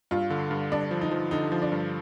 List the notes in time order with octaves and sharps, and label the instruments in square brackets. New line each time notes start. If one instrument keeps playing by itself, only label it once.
[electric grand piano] G2 [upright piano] F4
[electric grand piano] D3
G2
[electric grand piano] G2 [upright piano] D4
[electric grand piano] F3
[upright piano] D#4
[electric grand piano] F3
[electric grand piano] D3 [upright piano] D#4
[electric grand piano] F3
[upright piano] D4
[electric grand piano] G2